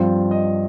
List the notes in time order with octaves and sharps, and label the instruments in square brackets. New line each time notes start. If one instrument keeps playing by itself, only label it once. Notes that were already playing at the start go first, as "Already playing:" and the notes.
Already playing: [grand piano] G2 F3 C4
D#5